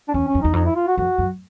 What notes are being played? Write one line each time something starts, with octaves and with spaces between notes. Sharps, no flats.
D4
E2 C#4
C#4
F2
E2 D#4
F2 D#4
E4
F4
F#4
F2 F#4
F#2